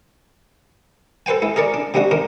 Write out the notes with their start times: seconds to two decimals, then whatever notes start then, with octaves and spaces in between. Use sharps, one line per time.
1.26 A4 B4 C5 G5 G#5
1.42 G#3 E4
1.56 G#4 A#4 C#5 D5
1.74 D4
1.94 C3 G3 G#3 D4 F#4
2.11 G#2 D4 A#4